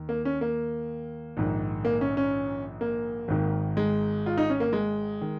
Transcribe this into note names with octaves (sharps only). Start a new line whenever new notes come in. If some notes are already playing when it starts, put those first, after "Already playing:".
Already playing: D#2 D#3
A#3
C#4
A#3
A#1 G#2 D#3
A#3
C#4
C#4
A#3
G#1 G#2 D#3
G#3
F4
D#4
C#4
A#3
G#3
D#3